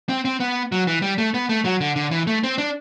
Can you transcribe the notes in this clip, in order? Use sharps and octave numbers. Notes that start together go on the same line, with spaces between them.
C4
C4
B3
F#3
E3
G3
A3
B3
A3
F#3
D3
D3
E3
A3
C4
D4